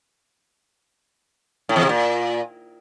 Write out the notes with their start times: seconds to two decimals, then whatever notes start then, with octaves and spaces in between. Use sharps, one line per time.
1.69 A2
1.76 E2
1.83 C3
1.89 A#2